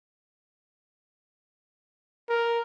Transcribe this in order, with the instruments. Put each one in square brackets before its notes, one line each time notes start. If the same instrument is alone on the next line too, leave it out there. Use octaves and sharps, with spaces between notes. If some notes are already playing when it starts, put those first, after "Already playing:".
[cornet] A#4